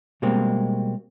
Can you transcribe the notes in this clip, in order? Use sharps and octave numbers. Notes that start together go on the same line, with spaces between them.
B2 G3 G#3 A#3 C4